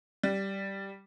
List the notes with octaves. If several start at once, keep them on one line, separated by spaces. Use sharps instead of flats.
G3